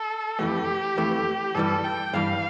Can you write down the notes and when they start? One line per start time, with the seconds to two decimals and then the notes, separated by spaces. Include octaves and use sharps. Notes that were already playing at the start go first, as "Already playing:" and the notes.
Already playing: A4
0.39 F2 E3 A3 G4
0.97 F2 E3 A3
1.54 G2 E3 G3 A4
1.84 G5
2.13 G2 E3 G3 F5